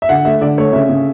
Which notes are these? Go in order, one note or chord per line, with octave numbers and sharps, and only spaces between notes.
E5
D3 F#5
A3 E5
D3 D5
A3 C#5
C#3 E5
C#3